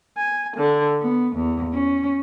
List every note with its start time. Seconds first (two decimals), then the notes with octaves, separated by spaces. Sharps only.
0.17 G#5
0.56 D3
1.02 B3
1.36 E2
1.72 C#4